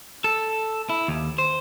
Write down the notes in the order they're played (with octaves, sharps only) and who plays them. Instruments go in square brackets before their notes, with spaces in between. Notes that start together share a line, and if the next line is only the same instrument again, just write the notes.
[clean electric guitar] A4
E4
D#2
C5